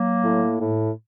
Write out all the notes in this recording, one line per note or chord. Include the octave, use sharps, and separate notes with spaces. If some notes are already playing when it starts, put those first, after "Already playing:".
Already playing: F#3 A#3
A2
A2